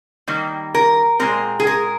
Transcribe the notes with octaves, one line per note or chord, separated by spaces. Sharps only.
D#3 G3 A#3
A#4
A#2 G#3 C4 A#4
G#4
A#4